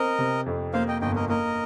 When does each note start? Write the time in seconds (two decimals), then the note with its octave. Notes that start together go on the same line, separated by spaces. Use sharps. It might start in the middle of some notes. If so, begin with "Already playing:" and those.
Already playing: C4 A#4 D#5
0.19 C3
0.46 F2
0.73 A#3 C5 F5
0.88 D#5 G5
1.01 G1 D#5 G5
1.15 A#4 D#5
1.29 A#3 A#4 D#5